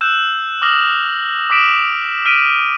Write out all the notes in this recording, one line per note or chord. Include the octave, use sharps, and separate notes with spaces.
E6 F#6 G6 E7
D6 D#6 F6 A#6 F#7
D6 D#6 B6 D7 E7 F#7
F6 B6 D7 D#7